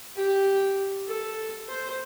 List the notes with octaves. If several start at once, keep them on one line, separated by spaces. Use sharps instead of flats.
G4
A4
C5